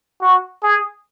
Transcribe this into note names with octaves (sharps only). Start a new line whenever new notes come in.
F#4
G#4